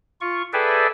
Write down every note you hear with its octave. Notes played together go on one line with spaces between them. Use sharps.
F4 C#6
G#4 A4 B4 D5 E5 G5